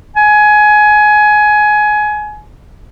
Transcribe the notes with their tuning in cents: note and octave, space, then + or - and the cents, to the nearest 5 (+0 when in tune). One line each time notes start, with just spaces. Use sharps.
G#5 +20